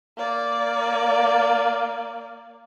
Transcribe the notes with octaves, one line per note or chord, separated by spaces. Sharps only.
A#3 D5